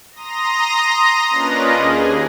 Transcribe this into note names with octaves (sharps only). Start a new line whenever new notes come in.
A#5 C6 D#6 A#6
A#3 C#4 D4 F4 B4 D#5
D#2 G#4